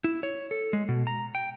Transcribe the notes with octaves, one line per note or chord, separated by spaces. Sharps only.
E4
C#5
A4
G#3
B2
A#5
G5